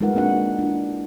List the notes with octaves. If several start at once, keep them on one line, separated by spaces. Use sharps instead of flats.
G#3 D#4 F4 A#4 B4 F#5
A#3 C4 D4 F#4 F#5
D4 E4